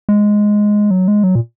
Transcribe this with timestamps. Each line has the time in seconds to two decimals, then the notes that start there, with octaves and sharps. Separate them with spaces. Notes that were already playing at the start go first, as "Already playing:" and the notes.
0.09 G#3
0.91 F#3
1.08 G#3
1.24 F#3
1.35 A#2